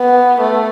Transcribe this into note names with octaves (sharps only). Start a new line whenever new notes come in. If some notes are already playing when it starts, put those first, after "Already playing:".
Already playing: B3
A3